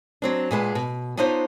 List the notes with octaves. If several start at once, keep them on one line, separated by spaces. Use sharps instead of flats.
F#3 C4 D4
A#2 G#3 B3 A5
B2
B3 D4 D#4 F4 C5 C#5